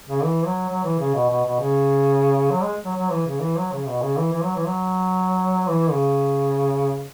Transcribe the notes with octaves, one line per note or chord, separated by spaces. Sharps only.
C#3
E3
F#3
F#3
E3
C#3
B2
B2
B2
C#3
F#3
G#3
F#3
F#3
E3
C#3
E3
F#3
C#3
B2
C#3
E3
E3
F#3
E3
F#3
E3
C#3